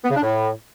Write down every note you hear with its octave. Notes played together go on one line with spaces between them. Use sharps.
B3
C#3
D4
A2